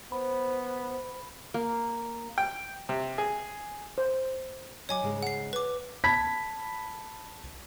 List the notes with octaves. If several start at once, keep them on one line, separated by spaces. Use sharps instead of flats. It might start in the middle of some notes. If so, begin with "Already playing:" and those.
B3 C5 B5
A#3
G5
C3
G#4
C5
F#3 C#5 D#5 G#5 D6
G#2 C#3 G#3
F#5 C7
B4 D6
A5 B5 G#6 B6